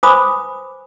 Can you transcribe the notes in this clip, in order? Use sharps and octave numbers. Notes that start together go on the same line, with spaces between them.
B4 C5 G#5 B5 D6 D#6